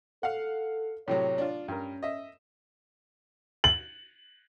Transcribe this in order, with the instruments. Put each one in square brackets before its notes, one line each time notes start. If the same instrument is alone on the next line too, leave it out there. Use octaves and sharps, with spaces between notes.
[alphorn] A4 [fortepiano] F5 F#5
[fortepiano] A2 C3 F#3 [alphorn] C#5
[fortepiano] D4 F4
[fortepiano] G2 A#4 [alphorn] C#4
[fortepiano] D#5 E5
[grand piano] F#7